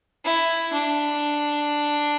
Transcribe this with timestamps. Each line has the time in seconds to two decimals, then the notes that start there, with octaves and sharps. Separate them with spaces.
0.25 E4
0.73 D4